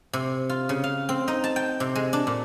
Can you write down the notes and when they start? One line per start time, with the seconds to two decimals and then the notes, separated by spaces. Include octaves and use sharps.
0.13 C3
0.50 F4
0.69 C#3
0.84 F5
1.09 C4
1.28 D#4
1.44 A5
1.56 G5
1.80 C3
1.95 G#3
2.13 D4
2.27 A#2